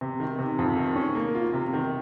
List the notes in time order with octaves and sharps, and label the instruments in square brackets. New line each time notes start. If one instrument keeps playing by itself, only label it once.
[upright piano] C3
D#3
C3
F2
D#3
C#4
A#3
F4
C3
D#3